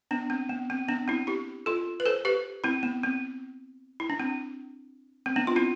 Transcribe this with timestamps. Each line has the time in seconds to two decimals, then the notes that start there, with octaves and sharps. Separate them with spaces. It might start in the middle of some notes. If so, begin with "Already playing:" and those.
0.11 B3 D4
0.30 C4
0.49 B3
0.70 C4
0.88 B3 D4
1.08 C4 E4
1.27 E4 G4
1.66 F4 A4
2.00 B4
2.06 A4 C5
2.25 G4 B4
2.64 C4 E4
2.83 B3
3.03 C4
4.00 E4
4.10 D4
4.20 C4
5.26 C4
5.36 B3 D4
5.47 F4
5.56 C4 E4